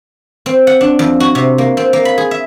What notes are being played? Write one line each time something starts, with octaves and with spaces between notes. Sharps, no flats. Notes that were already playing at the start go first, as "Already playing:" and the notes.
C4
F#5
D4
F2
F#4
C3
A#3
C4
A#3
B5
G#4
E5